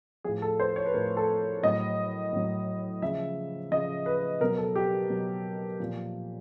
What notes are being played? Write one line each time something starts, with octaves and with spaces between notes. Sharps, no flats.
A2 F3 G#4
A4
C5
C#5
B4
A2 F3 A#4
A4
A2 F#3 D#5
A2 F#3
C#3 F3 E5
C#3 F3 D#5
B4
B2 F#3 A#4
A4
G4
B2 F#3
A#2 F3